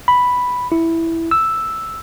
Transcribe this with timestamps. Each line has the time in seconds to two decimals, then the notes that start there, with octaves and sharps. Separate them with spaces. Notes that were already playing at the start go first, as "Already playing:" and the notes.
0.08 B5
0.72 E4
1.31 E6